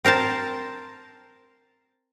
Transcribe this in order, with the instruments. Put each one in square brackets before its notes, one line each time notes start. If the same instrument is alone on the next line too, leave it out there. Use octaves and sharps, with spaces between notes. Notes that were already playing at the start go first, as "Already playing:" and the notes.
[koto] C4 A#4 C5 A5